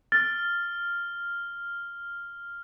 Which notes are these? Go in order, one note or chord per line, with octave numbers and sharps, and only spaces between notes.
F6 A6